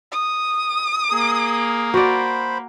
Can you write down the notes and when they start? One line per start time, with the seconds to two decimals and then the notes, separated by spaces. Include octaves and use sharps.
0.12 D#6
1.11 A#3 G#4
1.94 F#4 C5 D5 B5